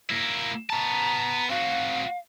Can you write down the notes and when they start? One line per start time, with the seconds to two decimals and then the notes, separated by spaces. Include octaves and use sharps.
0.10 A#3 E4
0.70 B3 A5 A#5
1.49 C4 F#4 F5